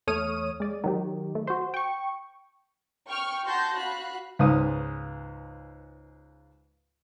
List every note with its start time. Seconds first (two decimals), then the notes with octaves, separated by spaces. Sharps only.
0.07 E2 A3 C#5 D#6 F6 D#7
0.60 G#3 D5
0.84 D#3 F#3 G4
1.35 A3
1.47 F#4 C5
1.74 G5 C#6
3.09 G5 C#6 F6
3.46 F#4 F#5 A5 C6 G6 A#6
3.77 F#4 F5 B5 F#6
4.39 C#2 G#2 B4 F5 D#6